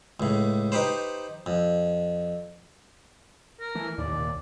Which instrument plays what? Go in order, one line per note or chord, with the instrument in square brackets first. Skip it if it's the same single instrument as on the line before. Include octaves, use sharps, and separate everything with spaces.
[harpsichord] C#2 A2
D#4 G4 B4 C5
F2
[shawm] A#4
[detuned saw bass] E3 [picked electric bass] A3
[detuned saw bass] D#2 [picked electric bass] A2 E3 [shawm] D5
[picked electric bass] C2 A#2